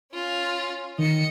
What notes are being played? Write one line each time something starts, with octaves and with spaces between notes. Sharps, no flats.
C#4 F4
D#3 D#5 C#7